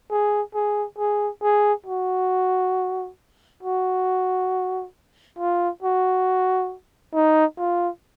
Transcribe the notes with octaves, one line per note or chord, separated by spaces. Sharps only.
G#4
G#4
G#4
G#4
F#4
F#4
F4
F#4
D#4
F4